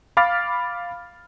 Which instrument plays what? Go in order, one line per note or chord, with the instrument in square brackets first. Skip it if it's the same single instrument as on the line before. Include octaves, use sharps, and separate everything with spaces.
[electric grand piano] F5 B5 D6 F6 A6